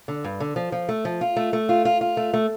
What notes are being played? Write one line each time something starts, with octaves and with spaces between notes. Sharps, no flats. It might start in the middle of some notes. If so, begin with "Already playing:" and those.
D3
G2
D3
F3
F3
A3
F3
F4
A3
A3
F4
F4
F4
A3
A3